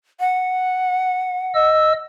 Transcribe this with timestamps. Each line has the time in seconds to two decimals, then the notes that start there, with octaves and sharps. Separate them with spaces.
0.20 F#5
1.55 D#5 E6